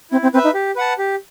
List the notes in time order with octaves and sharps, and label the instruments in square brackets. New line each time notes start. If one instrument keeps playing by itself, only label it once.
[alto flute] C4 [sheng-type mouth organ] E4
[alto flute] C4
[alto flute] C4 [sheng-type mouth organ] B4 E5
[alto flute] D#4
[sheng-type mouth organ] G4
B4 F#5 A5
G4